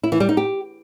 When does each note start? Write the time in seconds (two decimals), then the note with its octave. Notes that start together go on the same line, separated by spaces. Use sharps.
0.03 E4
0.12 E3
0.20 G3
0.29 D#4
0.37 G4